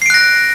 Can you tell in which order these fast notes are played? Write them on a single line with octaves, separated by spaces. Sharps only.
C7 D7 F#6 A#6